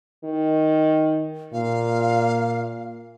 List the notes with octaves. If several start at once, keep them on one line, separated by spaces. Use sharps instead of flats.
D#3
A#2 F5